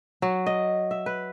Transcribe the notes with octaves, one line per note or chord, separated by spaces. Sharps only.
F#3
D#5
E5
B4